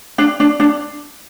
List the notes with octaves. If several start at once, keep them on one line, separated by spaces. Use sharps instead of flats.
D4
D4
D4